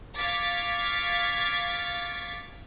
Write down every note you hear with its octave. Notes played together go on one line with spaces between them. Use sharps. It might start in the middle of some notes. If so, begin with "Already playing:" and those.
F5 C#6 D6 G#6 A6 B6